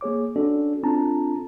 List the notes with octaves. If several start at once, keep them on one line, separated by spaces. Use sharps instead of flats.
A#3 G#4 C#5 D6
C#4 D4 F#4 A4 D5
C4 D4 F4 A4 A5 A#5